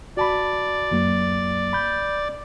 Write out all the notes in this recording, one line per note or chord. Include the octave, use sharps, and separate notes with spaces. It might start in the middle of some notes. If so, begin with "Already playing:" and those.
F#4 D5 A5 B5
F#2 F#3 A#3
B5 G6